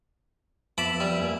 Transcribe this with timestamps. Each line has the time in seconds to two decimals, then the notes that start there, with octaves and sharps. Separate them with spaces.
0.78 F2 B3 E5 A5 B5 D6
1.00 G3
1.21 A#3 E5 G#5